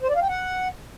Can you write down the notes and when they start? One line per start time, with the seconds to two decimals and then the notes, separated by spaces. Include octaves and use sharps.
0.03 C5
0.09 D5
0.16 F5
0.22 G5
0.29 F#5